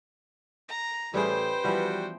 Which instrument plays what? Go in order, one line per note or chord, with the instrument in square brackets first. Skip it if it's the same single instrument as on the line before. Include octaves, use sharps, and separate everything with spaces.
[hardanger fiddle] A#5
[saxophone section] A2 E3 [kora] G3 C#4 G#4 [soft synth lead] B4 [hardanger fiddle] C5 G5
[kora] E3 F3 B3 [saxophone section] G3 F#4